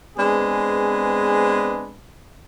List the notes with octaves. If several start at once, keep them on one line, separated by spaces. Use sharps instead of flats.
G#3 B3 C4 D4 G#4 B4